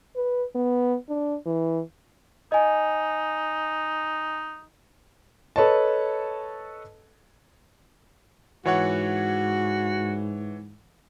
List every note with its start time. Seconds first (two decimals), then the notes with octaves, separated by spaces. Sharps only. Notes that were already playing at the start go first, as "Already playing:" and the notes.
0.16 B4
0.55 B3
1.09 D4
1.46 E3
2.52 D#4 D#5 G#5
5.56 A4 B4 C#5 D#5 A5
8.65 G#2 E3 F#4 C#5 F#5